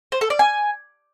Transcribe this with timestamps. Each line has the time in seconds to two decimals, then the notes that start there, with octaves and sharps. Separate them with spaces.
0.12 C5
0.21 A4
0.30 D5
0.39 G#5